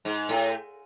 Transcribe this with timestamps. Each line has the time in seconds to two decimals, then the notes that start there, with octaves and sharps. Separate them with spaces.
0.05 G#2
0.29 A2